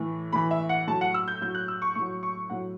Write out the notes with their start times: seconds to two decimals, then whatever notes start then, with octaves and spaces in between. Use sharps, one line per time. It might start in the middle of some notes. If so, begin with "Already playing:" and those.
Already playing: A2 E3
0.33 A2 E3 B5
0.51 E5
0.69 F#5
0.88 A2 F#3 A5
1.01 F#5
1.14 E6
1.28 G6
1.41 A2 F#3 G6
1.55 F#6
1.68 E6
1.82 C#6
1.95 A2 F#3 C#6
2.23 C#6
2.50 A2 F#3 F#5